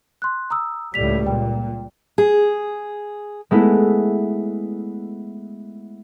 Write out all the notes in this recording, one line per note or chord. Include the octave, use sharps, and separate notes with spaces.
C6 F#6
A#5 D#6 E6
C#2 A2 G3 B6 F7
A#2 G5
G#4
G#3 A3 B3 E4